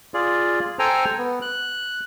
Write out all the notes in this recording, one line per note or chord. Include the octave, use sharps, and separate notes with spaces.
F4 G#4 D5
A4 C5 G5 G#5 A#5
B3
F#6